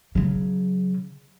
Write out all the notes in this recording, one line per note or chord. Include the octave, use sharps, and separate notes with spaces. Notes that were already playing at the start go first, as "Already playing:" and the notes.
C#3 F#3